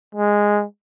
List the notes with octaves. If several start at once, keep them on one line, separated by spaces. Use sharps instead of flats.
G#3